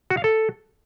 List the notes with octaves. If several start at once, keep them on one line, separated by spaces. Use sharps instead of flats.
F#4
F5
A4